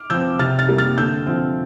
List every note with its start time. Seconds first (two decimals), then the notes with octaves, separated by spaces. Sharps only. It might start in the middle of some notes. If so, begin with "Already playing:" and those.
Already playing: D6 F6
0.10 F3 C4 E6 G6
0.39 C3 F6 A6
0.59 F6 A6
0.69 G3 A#3
0.78 F6 A6
0.98 D3 E6 G6
1.27 F3 C4